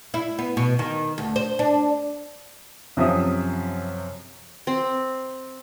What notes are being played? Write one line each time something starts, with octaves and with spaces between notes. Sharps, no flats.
E4
B3
B2
D#3
D2
C5
D4
F#2 C3 F3 E5 D#6
C4